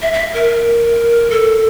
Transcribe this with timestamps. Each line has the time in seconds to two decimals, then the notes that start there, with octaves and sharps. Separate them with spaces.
0.02 E5
0.13 E5
0.34 A#4
1.31 A4